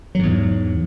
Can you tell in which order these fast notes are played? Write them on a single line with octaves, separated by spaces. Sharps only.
F#3 G#2 E2